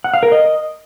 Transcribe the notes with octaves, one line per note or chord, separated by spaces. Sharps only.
F#5
F5
A#4
D#5